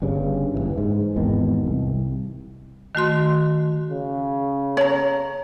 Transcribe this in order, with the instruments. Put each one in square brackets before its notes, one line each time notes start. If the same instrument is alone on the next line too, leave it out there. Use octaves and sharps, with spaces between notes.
[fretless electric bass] G1 G2 C#3
F#1 C#2 E3
G#2
G#1 E2 B2 D#3
C2
[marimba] D#3 A3 F#4 C6
[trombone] C#3
[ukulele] C#5 A#5